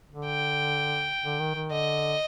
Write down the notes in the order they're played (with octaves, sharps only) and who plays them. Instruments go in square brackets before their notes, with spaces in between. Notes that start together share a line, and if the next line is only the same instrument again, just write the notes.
[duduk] D3
[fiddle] G5
[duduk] D3
D#3
D#3
[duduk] D3 [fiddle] D#5